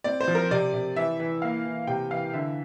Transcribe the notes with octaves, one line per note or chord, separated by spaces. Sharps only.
C4 D5
C5
F3
A#4
C3 D5
C3
E3 E5
E3
A#3 F5
E3
C3 G5
E3 F5
D3 E5